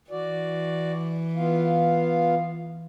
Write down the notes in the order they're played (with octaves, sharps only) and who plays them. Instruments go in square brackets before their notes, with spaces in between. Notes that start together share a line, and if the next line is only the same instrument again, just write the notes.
[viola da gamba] E3 [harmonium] F#4 D5
[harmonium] B3 F4 F5